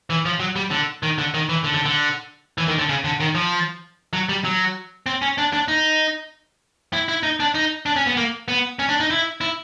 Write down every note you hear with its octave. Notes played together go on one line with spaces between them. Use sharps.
E3
F3
F#3
G3
D3
D#3
D3
D#3
E3
D3
D3
D3
E3
D#3
D3
C#3
D3
D#3
F3
F#3
G3
F#3
C4
C#4
D4
D4
D#4
E4
E4
D#4
D4
D#4
D4
C#4
B3
A#3
B3
C#4
D4
D#4
E4
E4